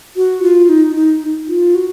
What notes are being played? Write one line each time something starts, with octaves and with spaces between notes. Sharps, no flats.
F#4
F4
D#4
D#4
F4
F#4